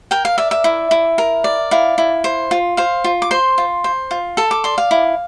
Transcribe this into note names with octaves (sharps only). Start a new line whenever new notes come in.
A#4 G5
F5
D5 E5
E5
E4
E4
A#4
D5
E4 F5
E4
C5
F4
C5 F5
F4
D6
C5 C6
F4
C5
F4
A4 A5
D6
D5 C6
F5
E4